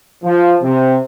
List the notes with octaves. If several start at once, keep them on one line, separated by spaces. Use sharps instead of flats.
F3
C3